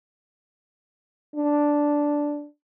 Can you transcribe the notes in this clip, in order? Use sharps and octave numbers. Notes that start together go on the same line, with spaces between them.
D4